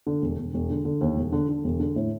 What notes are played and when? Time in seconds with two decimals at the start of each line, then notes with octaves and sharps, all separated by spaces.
0.07 D3
0.22 E1
0.38 E1
0.54 E1
0.70 D3
0.85 D3
1.01 D#2
1.17 E1
1.32 D3
1.49 D3
1.64 E1
1.80 D3
1.96 A2